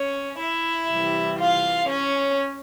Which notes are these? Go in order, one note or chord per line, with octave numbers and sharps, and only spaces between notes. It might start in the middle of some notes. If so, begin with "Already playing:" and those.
Already playing: C#4 C#5
E4 E5
C3 E3 G3
F4 F5
C#4 C#5